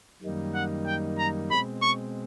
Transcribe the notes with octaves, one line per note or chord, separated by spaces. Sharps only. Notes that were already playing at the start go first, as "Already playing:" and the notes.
F#2 D#3 G3 A#3 D#4
F#5
G5
A#5
B2 G#3 C4 B5
C#6